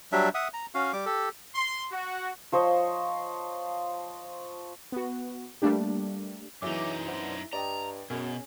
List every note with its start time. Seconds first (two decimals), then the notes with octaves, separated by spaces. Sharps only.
0.12 F#3 G3 D4 E5
0.34 E5 F#5 D#6
0.54 A#5
0.74 C#4 F#4 F5
0.93 G3 D6
1.06 G4 A4
1.54 C6
1.92 F#4
2.52 F3 C5 C#5 D#5
4.92 B3 F#4
5.62 G3 A3 A#3 D4 G4
6.62 F#2 E3 F#3 D#4 G#4 C#5 E5 D6
7.07 B3 D4 E4 C5
7.53 G2 D5 D#5 G5 A#5
8.10 F#2 B2 C#4 G#4